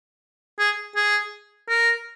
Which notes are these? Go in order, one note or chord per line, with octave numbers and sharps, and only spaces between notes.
G#4
G#4
A#4